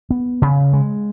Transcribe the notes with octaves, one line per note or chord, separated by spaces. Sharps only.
B3
C#3
G#3